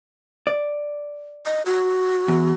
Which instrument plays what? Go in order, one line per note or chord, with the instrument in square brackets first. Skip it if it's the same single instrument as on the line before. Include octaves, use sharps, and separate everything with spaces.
[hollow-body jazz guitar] D5
[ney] D#5
F#4
[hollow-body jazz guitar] E2